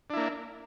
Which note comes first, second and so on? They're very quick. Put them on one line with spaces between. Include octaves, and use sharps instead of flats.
D4 E4 A#3